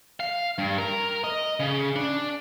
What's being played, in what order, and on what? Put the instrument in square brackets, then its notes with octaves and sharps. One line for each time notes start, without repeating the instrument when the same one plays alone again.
[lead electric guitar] F5
G2
A#4
D#5
C#3
D4